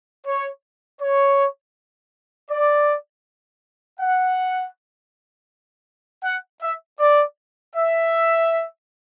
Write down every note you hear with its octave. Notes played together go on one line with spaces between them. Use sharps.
C#5
C#5
D5
F#5
F#5
E5
D5
E5